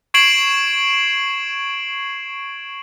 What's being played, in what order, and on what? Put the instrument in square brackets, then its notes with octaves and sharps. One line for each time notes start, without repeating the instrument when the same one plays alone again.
[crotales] C#6 G#6 C7 D7 E7 F#7